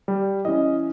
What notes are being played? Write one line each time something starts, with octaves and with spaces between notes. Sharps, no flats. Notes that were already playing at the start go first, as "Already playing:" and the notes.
G3
E3 C#4 D#5